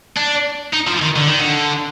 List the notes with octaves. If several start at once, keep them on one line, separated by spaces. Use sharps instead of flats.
D4
D#4
F3
D#3
D3
D#3
D3